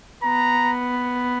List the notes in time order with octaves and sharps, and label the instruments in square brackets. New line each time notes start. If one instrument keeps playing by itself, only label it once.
[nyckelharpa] B3 [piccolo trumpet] A#5